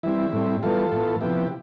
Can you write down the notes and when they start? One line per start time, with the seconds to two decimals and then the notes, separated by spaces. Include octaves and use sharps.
0.03 E3 G3 C4 E4
0.33 A2 G3 C4
0.62 E3 G3 B3 F4 A4
0.92 A2 E3 B3
1.21 C3 F3 B3 E4 G4